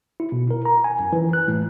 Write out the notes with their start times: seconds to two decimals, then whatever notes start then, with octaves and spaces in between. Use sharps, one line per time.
0.20 E4
0.32 B2
0.51 A#4
0.65 A#5
0.84 G#5
1.00 F#2
1.13 E3
1.33 F#6
1.48 A2